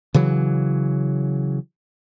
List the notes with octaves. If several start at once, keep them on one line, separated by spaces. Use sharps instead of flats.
C#3 E3 F#3